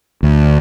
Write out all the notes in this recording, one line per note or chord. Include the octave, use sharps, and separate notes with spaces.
D2